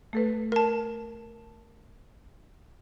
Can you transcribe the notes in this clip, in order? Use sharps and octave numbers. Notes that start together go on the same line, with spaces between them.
A3 A4 B4
A#4 A5